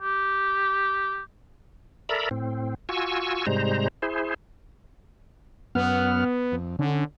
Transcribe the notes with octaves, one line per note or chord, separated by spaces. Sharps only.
G4
A4 A#4 D5 E5 A#5 B5
A2 C4
F4 F#4 G#5 C#6 E6
G#2 C3 G3 G#3 C5 A#5
E4 G#4 C5
F#2 B3 F#5 F6
F2
D3 C#4